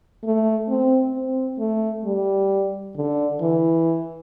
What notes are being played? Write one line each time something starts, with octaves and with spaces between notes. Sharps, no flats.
A3
C4
C4
A3
G3
D3
E3